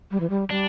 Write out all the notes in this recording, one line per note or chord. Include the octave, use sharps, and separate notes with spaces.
G3
E3
G3
G3 D4